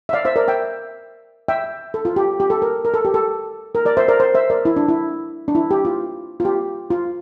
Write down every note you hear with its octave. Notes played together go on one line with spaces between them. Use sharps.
E5
D5 F5
C5 E5
A#4 D5
E5 G5
E5 G5
A4
F4
G4
G4
A4
A#4
A#4
A4
G4
A4
A#4
A#4 D5
C5 E5
A#4 D5
C5
C5 E5
A#4 D5
E4
D4
E4
D4
E4
G4
F4
F4
G4
F4